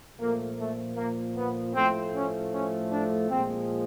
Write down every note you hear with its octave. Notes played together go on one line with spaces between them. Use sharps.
A#2 F3 A3 A#3
A3
A#3
B3
A2 F3 A3 C4
C#4
C#4
D4
A#2 F3 G#3 C4